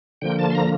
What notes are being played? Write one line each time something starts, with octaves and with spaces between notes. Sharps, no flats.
D3 F3 A#3 G5
A5
C6
A#5